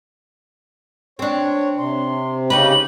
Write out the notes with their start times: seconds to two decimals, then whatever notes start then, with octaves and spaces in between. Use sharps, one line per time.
1.19 C4 D4 C#5
1.78 C3 C6
2.50 C#3 C#4 D#4 G4 B4 F#7